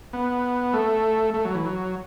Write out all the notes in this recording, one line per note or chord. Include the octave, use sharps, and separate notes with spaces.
B3
A3
A3
F#3
E3
F#3